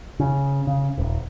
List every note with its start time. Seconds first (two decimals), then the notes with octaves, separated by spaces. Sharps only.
0.20 C#3
0.67 C#3
0.98 D#1